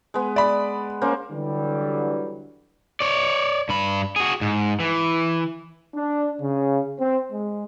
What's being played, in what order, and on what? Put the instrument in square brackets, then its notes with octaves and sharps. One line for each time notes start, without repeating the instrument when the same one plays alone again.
[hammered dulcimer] G#3 B3
[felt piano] D5 B5
[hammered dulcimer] A#3 C#4 C5
[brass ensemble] D3 E3 F#3 G3
[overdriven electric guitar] C#5 D5
G2 B5
F#4 G#4
G#2
E3
[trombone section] D4
C#3
C4
G#3